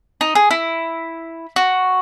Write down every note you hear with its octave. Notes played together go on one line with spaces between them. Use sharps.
D#4
G#4
E4
F#4